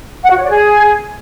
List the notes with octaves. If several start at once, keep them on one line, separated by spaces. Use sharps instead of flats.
F#5
F#4
C#5
D5
G#4